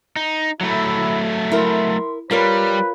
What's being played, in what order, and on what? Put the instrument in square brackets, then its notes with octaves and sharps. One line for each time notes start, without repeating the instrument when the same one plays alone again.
[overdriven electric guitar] D#4
[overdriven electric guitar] F#3 A3 [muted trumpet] E4
[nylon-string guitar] E4 A#4 [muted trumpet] C6
[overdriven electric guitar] G3 [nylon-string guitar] F4 A#4 C#5 [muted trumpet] B4